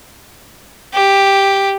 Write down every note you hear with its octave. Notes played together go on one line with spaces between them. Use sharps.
G4